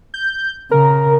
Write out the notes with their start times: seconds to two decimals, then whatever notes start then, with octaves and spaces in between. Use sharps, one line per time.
0.14 G6
0.71 C#3 A#4